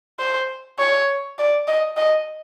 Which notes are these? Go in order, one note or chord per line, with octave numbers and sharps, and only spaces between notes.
C5
C#5
D5
D#5
D#5